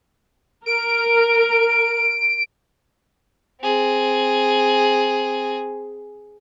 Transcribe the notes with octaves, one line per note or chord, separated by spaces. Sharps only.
A#4 D7
C4 G#4